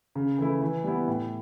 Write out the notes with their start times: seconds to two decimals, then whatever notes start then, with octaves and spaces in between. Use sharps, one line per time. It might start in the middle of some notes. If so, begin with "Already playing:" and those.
0.15 C#3
0.38 E3 A3 E4
0.61 E3
0.84 G3 B3 E4
1.08 A2